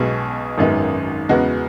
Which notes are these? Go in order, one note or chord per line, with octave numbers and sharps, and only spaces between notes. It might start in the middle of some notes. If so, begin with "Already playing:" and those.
Already playing: B1 B2 G#3 B3 G#4
G#1 F#2 D#3 G#3 B3
E2 C#3 G#3 B3 F#4